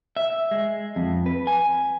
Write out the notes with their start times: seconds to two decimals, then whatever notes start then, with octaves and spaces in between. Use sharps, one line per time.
0.17 E5
0.51 G#3
0.96 F2
1.26 B4
1.47 G#5